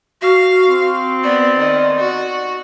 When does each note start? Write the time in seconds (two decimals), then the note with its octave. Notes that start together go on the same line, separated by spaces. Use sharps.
0.22 F#4 F5
0.67 C4
1.24 B3 D5
1.57 D#3
1.99 F#4